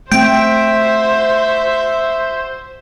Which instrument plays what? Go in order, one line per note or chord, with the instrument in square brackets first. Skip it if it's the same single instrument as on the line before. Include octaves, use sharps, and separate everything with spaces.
[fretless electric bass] A3 C4 [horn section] F#4 E5 [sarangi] C5 [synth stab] G5